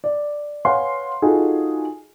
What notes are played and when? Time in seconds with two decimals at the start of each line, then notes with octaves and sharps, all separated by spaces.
0.04 D5
0.65 B4 C#5 F5 F#5 G#5 C6
1.22 D#4 F4 F#4 G#4 A4